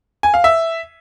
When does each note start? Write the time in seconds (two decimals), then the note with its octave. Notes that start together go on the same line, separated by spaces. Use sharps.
0.23 G#5
0.34 F5
0.44 E5